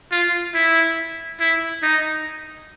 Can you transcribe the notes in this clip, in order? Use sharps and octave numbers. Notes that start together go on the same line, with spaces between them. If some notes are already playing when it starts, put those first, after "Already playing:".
F4
E4
E4
D#4